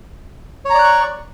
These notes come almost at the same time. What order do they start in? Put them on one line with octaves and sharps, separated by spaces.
C#5 A#5 D5 F#6 C#6